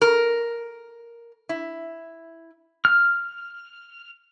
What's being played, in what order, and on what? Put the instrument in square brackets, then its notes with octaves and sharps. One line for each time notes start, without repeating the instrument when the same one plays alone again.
[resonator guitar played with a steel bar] A#4
E4
[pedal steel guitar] F6